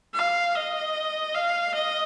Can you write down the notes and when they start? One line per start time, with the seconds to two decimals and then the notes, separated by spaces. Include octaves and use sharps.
0.14 F5
0.55 D#5
1.35 F5
1.74 D#5